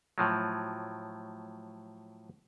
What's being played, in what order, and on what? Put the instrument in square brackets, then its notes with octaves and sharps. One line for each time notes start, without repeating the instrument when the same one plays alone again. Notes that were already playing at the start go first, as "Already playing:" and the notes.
[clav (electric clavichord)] A2 F3 F#3